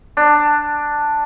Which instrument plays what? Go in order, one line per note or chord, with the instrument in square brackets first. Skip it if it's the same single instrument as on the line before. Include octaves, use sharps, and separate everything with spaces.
[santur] D4